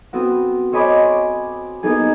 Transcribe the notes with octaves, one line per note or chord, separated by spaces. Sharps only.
B3 C4 F#4
C5 C#5 D#5 G#5 B5 D6
D7
A#3 B3 D#4 G#4